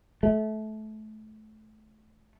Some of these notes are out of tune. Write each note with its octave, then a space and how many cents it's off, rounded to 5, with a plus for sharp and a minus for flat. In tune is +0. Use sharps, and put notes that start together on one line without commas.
A3 -25